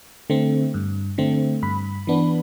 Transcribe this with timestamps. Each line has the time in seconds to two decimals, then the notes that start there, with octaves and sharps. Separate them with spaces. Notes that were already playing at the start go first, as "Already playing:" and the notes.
0.30 D3 A3 C4
0.74 G2
1.18 D3 A3 C4
1.62 G2 B5
2.07 E3 B3 D4